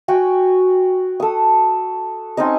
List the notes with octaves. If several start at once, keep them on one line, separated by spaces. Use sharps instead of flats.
F#4 G5 G#5
A4 D#6
C4 C#4 D#4 D#5